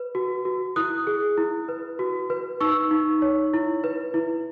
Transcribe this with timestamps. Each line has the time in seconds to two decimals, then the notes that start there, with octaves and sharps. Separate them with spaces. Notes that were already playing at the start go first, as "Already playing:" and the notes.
Already playing: B4
0.15 F#4
0.45 F#4
0.76 E4 D#6 F#6
1.07 G#4
1.38 E4
1.68 B4
1.99 F#4
2.30 B4
2.61 D#4 C#6 E6
2.91 D#4
3.22 C#5
3.54 E4
3.84 B4
4.14 E4